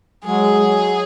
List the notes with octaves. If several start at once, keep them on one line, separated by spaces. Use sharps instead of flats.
F#3 G#3 G#4
F#3